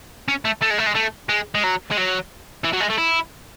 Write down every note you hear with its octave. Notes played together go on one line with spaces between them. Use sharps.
C#4
A3
A3
G#3
A3
G#3
A3
G#3
G#3
F#3
G#3
F#3
E3
F#3
G#3
A3
E4